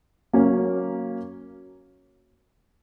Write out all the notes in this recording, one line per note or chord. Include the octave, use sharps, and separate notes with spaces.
F#3 A#3 C#4